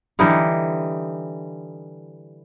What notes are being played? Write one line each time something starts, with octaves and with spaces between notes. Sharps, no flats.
D3 E3 G3 D#4